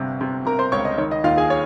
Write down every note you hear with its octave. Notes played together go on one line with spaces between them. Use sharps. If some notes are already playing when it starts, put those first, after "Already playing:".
Already playing: G1 C3
C3
C3 A#4 A#5
C5 C6
C#2 C#5 C#6
D#5
D#3 C#5
D#5
D#2 F4 F5
G#4 G#5
C#5